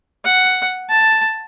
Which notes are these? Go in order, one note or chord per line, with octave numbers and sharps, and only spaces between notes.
F#5
A5